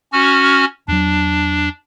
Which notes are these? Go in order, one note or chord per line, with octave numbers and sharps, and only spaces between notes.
C#4 F#4 F6
E2 F#3 D4